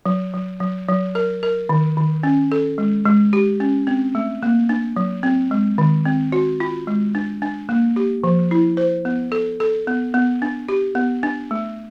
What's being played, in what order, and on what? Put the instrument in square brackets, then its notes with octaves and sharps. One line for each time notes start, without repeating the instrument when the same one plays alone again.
[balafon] F#3
F#3
F#3
F#3
A#4
A#4
D#3
D#3
C#4
A4
G#3
G#3
G4
C#4
C4
A3
A#3
D4
F#3
C4
G#3
D#3
C4
F#4
F4
G#3
D4
D4
A#3
G4
F3
E4
C5
B3
A4
A4
B3
B3
D4
G4
B3
D4
A3